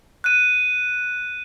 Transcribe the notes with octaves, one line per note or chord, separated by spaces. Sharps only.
F#6 D#7